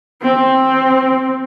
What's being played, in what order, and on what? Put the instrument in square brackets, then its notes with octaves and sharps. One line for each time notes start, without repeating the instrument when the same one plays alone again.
[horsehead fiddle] C4